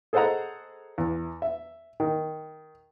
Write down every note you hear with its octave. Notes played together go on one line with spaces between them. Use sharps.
G#4 A4 C5 D#5 F#5 A#5
E2
E5
D#3